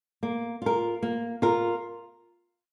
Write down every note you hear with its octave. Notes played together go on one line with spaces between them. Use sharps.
A#3
F4 A#4
A#3
F4 A#4